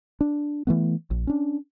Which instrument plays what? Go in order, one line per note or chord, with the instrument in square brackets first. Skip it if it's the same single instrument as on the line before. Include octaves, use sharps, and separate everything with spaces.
[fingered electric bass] D4
E3 A3 B3
A#1
C#4 D4